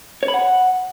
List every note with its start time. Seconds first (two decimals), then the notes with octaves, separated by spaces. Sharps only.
0.23 C#5
0.28 B5
0.34 F#5